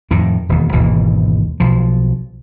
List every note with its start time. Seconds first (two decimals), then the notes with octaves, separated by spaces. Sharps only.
0.11 F2 A2 D#3
0.49 E1 D#2
0.72 G#1 D#2 B2 E3
1.60 B1 F3